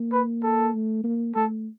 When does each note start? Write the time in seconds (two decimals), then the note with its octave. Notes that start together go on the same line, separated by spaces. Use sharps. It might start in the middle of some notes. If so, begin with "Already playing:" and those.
Already playing: A#3
0.12 B4
0.43 A4
0.74 A3
1.04 A#3
1.36 A3 A4